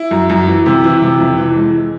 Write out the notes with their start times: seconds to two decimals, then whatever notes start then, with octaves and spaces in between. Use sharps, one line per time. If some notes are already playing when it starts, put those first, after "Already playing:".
Already playing: E4
0.11 F#2
0.29 F#2
0.48 E3
0.66 C3
0.84 E3
1.02 C3
1.20 F2
1.38 E3
1.56 G#3